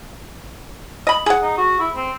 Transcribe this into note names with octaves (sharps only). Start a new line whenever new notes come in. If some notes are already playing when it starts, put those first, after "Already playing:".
D#5 B5
G#4 F#5
D#4
F#4
E4
C4